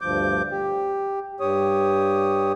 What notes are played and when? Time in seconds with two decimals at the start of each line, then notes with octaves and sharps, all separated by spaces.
0.01 D2 G2 F3 D6 G6
0.51 G4
1.40 G2 G4 C#5 D#6